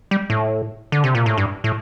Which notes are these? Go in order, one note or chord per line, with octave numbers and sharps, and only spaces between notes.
G3
A2
D3
C3
A#2
A2
G2
A2